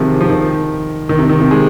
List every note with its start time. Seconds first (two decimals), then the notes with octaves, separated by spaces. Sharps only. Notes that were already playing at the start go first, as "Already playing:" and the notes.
Already playing: C3 D#3 F3 G#3
0.20 F3
0.30 D#3
1.09 D#3
1.19 C3
1.29 D#3
1.41 C3
1.51 G#3